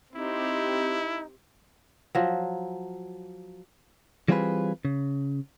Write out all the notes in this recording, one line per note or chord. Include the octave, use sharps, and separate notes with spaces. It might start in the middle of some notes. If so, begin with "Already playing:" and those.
C4 D#4 E4 G4
F3 F#3
E3 G3 C4 F4 G#4 B4
C#3